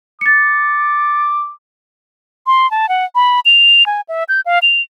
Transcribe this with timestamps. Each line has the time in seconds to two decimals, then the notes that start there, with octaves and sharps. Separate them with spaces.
0.21 D6 A6 C#7
2.47 C6
2.71 A5
2.89 F#5
3.15 B5
3.45 F7
3.86 G#5
4.09 E5
4.29 G6
4.46 F5
4.62 F7